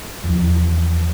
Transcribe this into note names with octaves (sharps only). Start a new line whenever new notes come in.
E2 F3